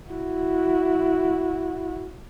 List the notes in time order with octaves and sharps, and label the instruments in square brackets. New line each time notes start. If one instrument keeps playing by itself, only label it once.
[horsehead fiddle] E4 F#4